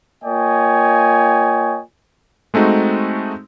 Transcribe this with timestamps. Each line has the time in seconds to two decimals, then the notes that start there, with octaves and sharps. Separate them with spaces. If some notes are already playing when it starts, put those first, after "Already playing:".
0.24 A#3 F4 C#5 D#5 G5 G#5
2.54 G#3 A3 C4 D#4 F#4